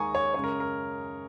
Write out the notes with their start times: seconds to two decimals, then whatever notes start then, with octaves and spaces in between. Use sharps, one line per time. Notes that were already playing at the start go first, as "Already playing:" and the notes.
Already playing: D#2 D#3 G#3 G#5 A#5 C#6 D#6
0.15 C#5
0.34 F#2 C#3 G#3 C#5
0.44 A#4
0.60 A#4